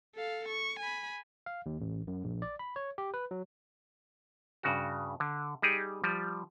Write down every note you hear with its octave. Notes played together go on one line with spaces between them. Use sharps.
A4 F5
C#6
G#5 B5
F5
D#2
A1
F#2
A#1
D5
B5
C#5
G4
B4
F#3
G2 C#3 F#4
D3
G3 D#4 G4 G#4
F3 G3